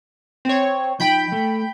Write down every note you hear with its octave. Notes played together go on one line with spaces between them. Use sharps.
C4 C#5
F3 D#4 G5 B5 G6
A3